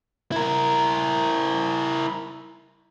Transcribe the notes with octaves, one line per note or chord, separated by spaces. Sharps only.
E4 A#4